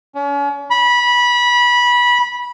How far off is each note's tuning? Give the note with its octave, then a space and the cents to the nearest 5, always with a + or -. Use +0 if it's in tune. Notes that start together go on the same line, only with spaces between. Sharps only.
C#4 +35
B5 -20